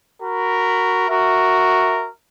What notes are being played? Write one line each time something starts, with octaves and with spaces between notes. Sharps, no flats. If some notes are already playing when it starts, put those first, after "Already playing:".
F#4 A#4 B5
F#4 A#4 E5